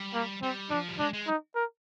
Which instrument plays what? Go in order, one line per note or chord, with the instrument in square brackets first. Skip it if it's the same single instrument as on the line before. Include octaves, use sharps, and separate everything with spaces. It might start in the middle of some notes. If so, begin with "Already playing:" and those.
Already playing: [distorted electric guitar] G3
[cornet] A#3
[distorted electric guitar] G3 [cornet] C4
[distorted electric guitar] F3 [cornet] D4
[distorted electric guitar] G3
[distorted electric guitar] G#3 [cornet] D4
[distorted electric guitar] G#3
[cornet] D#4
A#4